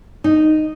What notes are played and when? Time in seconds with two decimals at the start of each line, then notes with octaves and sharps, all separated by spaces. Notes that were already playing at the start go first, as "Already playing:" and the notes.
0.24 D#4